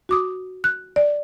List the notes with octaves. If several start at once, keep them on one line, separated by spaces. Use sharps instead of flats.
F#4 D6 D#6
F#6
D5